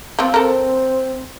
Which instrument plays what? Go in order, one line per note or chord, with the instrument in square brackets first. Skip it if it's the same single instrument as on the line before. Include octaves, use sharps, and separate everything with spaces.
[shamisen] F3 C4
[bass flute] C4 [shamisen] A4 A#4